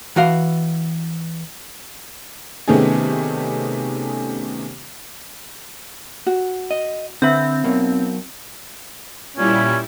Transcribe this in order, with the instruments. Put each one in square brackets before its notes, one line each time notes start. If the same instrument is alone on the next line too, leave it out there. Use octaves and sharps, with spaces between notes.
[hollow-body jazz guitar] E3 F#4 F5
[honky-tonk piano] C3 D#3 A3 B3 C#4 G#4
[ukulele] F#4
[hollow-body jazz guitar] D#5
[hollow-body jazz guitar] D3 [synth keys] C4 [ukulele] B4 E5 B5
[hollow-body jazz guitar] B1 B2 A#3
[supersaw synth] A#2 G3 E4 [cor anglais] C#4